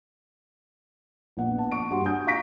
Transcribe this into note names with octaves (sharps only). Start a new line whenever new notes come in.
A#1 B3 F#5
A5
C#6 D7
G2 F#4 G4 F#5 C6
G#5 D#6 G6
F5 A#5 C#6 A#6 B6 D7